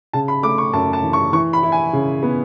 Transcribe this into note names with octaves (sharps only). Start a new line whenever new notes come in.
C#3 A5
B5
A3 D6
C#6
F#2 A5
A5
E3
C#6
E3 C#6
B5
E4
G#5
C#3
B3